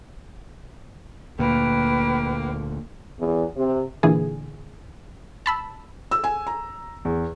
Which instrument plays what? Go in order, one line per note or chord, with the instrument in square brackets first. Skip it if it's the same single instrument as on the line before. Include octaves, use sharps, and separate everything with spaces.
[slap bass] D2 A#2 [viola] A#3 [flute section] B4 G5
[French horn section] E2
C3
[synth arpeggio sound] A#2 D3 E3 G#4
A5 B5 E6
[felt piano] E6
G#5
A#5
E2